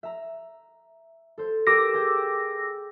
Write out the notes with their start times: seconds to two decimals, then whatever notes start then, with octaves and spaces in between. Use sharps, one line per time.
0.03 E5 A#5
1.38 A4 C5
1.67 G4 A#4 D6 E6 A#6
1.94 G#4 G5